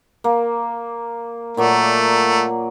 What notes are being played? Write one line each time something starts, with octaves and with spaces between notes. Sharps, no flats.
A#3
A#2 F#3 A3 D5